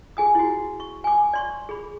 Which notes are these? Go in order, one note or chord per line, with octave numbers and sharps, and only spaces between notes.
G#4 G#5 D#6
E4 F#4
C#6
G#5 D6
D5 C6 C#6
G#4 B5